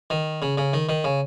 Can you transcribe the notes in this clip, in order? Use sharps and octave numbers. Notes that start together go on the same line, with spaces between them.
D#3
C#3
C#3
D#3
D#3
C#3